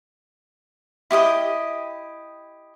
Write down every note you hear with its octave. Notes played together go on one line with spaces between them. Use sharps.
E4 G4 D#5 D#6